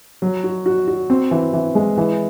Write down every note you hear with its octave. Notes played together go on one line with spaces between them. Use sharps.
F#3
F#4
F#4
F#4
C4
E3
E3
G#3
E3